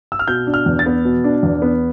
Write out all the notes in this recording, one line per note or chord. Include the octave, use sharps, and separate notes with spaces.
E6
F6
B2 G6
D4
F6
E2
A6
B3
B2
D4
E2
B3